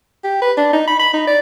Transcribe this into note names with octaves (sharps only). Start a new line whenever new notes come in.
G4
B4
D4
D#4
B5
B5
D#4
D5